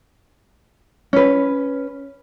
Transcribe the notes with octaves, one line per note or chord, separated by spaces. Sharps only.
C#4 B4